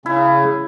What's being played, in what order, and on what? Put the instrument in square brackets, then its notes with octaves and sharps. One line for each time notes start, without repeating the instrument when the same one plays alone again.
[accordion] C#3 [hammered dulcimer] E4